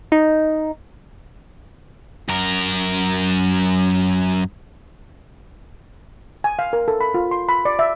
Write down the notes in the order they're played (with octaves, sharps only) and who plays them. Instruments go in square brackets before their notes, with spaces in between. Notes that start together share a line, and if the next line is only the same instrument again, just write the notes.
[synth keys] D#4
[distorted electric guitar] F#2 A#4
[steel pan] G#5
F5
A#4
A4
B5
F4
C6
B5
D5
E5